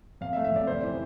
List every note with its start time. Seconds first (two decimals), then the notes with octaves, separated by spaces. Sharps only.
0.21 F2 F5
0.33 E5
0.36 A3
0.44 E5
0.52 F2 D5
0.67 C3 C5
0.83 E3